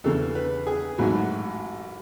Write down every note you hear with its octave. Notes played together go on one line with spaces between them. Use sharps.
E2 C#3 E3 A4
B4
G#4
A1 G#2 F#3 F#4